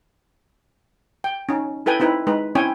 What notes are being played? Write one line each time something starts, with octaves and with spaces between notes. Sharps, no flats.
G5
C#4 D#4
E4 A4 B4 G5 G#5
C4 D#4 E4 B4
G#3 D#4 B4
C4 C#4 E4 C#5 G5 G#5